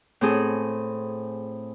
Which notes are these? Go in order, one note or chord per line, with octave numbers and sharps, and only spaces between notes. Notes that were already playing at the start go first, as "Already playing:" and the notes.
A2 C4 G#4 A4